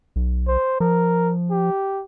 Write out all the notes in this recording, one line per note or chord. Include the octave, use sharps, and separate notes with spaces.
B1
C5
F3 A#4
G4